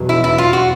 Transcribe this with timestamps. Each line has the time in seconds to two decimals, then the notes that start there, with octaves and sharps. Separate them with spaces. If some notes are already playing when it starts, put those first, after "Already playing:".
Already playing: E2 B2 F#3
0.09 E4
0.24 E4
0.38 F4
0.53 F#4